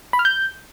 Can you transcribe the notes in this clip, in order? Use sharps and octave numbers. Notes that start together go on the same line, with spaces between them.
B5
F6
G6